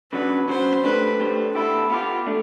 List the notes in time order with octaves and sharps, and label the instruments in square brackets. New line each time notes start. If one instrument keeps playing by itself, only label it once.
[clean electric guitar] C#3 F#3 B3 D4 [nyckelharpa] B4
[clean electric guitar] C#3 F#3 B3 D4 [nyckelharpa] C5
[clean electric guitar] A3 D4 G4 C5 [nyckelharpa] B4
[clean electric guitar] A3 D4 G4 C5
[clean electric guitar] B3 E4 G4 [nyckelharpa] A4
[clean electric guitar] B3 E4 G4 [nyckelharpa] F4
[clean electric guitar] A3 D4